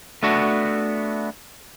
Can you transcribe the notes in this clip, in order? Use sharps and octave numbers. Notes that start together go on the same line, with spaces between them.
A3 B3 D4 F#4